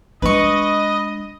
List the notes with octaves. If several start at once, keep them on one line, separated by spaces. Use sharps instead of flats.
G#3 D4 B4 D#5 C#6